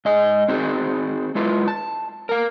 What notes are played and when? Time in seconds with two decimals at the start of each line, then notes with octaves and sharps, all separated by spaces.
0.05 G#2 D#5 G#5
0.48 C4 D#4 F#4 G#4
1.35 G#3 E4 F4 B4
1.68 A5
2.29 A#4 F5